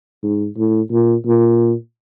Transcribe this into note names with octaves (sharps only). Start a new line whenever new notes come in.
G#2
A2
A#2
A#2